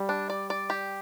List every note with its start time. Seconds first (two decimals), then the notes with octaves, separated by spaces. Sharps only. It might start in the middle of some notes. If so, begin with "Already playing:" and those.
Already playing: G3
0.09 D4
0.30 D5
0.50 D5
0.70 G4